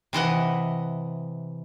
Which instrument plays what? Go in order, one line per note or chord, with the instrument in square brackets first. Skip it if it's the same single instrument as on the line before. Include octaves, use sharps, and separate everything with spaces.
[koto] C3 E3 D#5 F#5